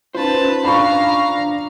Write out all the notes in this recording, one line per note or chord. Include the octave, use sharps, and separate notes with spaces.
C#4 D#4 F4 B4 C5 A5
D4 F5 A#5 B5 C#6